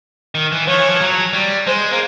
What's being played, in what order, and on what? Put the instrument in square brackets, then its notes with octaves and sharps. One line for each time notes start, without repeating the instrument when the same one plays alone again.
[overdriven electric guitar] D#3
E3
[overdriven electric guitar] F3 [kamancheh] C#5
[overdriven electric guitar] E3
F3
F#3
G3
[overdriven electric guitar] G#3 [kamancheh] C5
[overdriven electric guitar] A#3